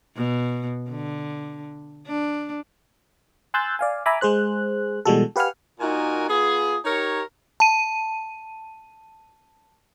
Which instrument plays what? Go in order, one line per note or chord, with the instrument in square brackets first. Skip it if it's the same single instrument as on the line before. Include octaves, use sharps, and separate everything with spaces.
[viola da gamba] B2
D3
D4
[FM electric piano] G#5 C6 E6 F#6 G6 A6
D5 F5 G#5
E5 G#5 A#5 B5 D6
G#3 G#4 C5 F#6
B2 E3 G3 G#3 F#4 A4
G4 B4 F5 F#5 G#5 F6
[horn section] A#2 D#4 F#4 A#4 G#5
B3 F4 G#4
D#4 G4 A#4 C#5
[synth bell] A5 D#7